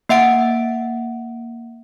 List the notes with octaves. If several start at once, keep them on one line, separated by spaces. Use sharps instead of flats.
A#3 E5 F#5 D7